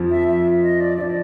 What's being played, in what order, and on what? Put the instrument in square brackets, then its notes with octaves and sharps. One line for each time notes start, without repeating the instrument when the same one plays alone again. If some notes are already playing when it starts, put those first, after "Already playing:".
Already playing: [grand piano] F2 F3
[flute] E5
E5
D#5
D5
[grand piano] F3 [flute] D5 E5